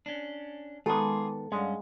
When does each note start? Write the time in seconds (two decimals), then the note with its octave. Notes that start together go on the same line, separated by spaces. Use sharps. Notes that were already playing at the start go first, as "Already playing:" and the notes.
0.06 C#4 D4
0.86 D#3 G#3 B3 F4 G#4 A4 C6 D6
1.52 G2 G#3 C#4 D5 F5 F#5